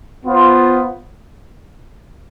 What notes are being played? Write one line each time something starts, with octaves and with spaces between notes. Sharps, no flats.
B3 F4 C5